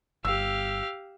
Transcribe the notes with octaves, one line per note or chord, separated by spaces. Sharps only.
G1 G4 F5 E6